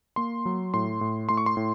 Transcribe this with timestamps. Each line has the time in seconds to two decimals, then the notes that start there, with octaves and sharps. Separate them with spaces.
0.16 A#3 C6
0.46 F#3
0.74 A2 C6
1.01 A2
1.29 A2 C6
1.37 C#6
1.46 C6
1.57 A2